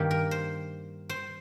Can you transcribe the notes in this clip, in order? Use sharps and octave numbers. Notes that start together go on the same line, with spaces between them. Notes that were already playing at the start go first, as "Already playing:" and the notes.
Already playing: G2 D#3 A#3 G4
A#4
C5
C5